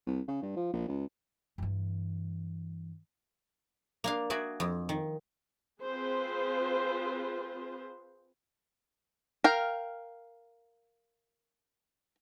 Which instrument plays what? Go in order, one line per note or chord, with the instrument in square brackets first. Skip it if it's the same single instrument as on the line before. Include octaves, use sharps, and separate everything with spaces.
[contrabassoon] C2
C#3
G2
F3
A#1
C#2
[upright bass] G2 E3
[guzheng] A#3 D4 F5
F#4 G#4 D5 E5
F2
D#3
[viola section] C4 F4 G#4 B4 C5
[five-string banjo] A#4 F5 G5